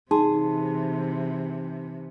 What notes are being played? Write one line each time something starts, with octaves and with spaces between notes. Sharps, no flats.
C3 E3 D#4 G#4 A5 C6